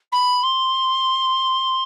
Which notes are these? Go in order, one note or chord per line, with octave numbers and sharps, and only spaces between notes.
B5
C6